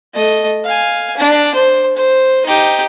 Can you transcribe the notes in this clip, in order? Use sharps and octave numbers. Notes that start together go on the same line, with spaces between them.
A3 D#5
F5 G#5
D4
C5
C5
D#4 G4